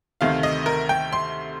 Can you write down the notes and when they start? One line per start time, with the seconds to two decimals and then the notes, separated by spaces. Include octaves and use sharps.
0.21 D2 C3 D#3 A3 F5
0.43 D#5
0.66 A#4
0.89 G5
1.13 C6